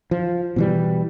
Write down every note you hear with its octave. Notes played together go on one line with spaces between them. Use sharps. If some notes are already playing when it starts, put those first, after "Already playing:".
F3
B2 E3 G3